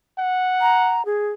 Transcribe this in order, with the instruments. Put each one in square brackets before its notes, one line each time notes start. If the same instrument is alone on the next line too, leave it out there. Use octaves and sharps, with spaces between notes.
[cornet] F#5
[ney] A#5
G#4